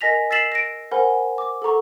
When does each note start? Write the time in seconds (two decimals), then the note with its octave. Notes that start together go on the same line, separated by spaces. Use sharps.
0.01 A#4 D#5 G#5 A#6 B6 F7
0.30 E6 A6 B6 C7 E7 F#7
0.52 A#6 D7
0.92 A#4 C5 F#5 G#5 B5
1.38 D6
1.62 A4 F#5 A#5 C#6